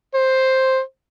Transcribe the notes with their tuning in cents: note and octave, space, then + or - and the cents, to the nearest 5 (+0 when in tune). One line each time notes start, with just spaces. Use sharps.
C5 +5